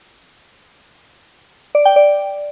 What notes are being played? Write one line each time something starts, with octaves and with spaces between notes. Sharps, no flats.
D5
G5
D5